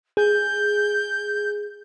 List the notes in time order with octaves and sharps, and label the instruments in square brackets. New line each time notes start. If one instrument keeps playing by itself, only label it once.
[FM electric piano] G#4 [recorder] G6